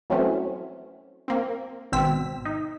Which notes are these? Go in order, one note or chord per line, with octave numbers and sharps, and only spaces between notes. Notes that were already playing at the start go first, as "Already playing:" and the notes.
E3 F#3 A3 C4 C#4
A#3 C4
G#1 B2 C4 E6 B6
D#4